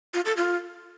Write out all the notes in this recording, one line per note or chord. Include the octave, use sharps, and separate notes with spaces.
F4
A4
F4